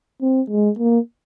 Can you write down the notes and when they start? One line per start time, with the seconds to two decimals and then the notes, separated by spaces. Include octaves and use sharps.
0.21 C4
0.50 G#3
0.79 A#3